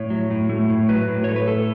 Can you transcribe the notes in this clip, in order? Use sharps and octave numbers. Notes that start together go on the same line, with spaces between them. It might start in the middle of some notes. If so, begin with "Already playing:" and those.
Already playing: A2 C#5
F#3
A2
A3
A2
F#3 B4
A2
A3 C#5
B4
A2 A4